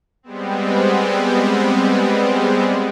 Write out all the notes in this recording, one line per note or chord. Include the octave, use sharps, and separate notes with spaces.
G3 G#3 B3 C4